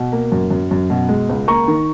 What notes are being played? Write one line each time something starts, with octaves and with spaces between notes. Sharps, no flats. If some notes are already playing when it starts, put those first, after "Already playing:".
Already playing: B2
A#3
F#2
F#2
F#2
B2
G#3
C#2
A#3 A#5 C#6
D#3